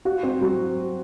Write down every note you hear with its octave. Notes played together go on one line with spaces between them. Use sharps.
F#4
C4
F#3